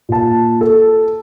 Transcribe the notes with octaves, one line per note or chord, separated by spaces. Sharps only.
A#2 A5
A4